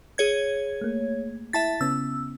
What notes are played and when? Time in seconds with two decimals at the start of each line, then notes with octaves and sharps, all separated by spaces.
0.18 G#4 C#5 G#6
0.81 A3 A#3
1.53 E4 E5 A5 A6 B6
1.81 C#3 B3 C#4 E6